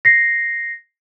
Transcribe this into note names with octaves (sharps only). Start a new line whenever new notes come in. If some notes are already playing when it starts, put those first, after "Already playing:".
A#6 C7